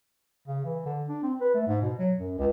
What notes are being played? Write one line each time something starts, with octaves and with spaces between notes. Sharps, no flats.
C#3
E3
D3
D4
C4
B4
A3
G#2
B2
F#3
F#2
C#2